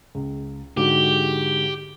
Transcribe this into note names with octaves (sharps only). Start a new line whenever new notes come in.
C#2
G#2 D3 F#4 G4